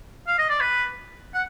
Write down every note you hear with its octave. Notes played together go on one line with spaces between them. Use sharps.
F5
D#5
D5
B4
F#5